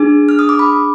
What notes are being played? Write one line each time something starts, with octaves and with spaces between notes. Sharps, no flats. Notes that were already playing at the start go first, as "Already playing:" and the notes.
Already playing: D4 G#4
F6
D#6
D6
B5